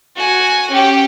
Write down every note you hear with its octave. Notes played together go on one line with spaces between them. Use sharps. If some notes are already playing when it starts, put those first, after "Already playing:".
F#4 G#5
C#4 G4